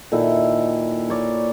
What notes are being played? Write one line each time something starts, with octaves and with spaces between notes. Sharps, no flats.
A#2 D#3 E4 A4
A#4 C#5 D5